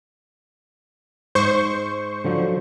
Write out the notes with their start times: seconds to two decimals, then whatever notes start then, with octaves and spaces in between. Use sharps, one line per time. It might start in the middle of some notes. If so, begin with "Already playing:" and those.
1.35 G#2 C5 C#6
2.25 D3 F3 F#3